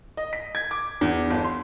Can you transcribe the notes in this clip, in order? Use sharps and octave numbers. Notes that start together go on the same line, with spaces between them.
D#5
B6
G#6
D6
E2
G1
C6